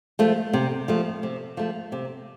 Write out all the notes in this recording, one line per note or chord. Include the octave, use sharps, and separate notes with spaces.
F3 A3
C3
F3 A3
C3
F3 A3
C3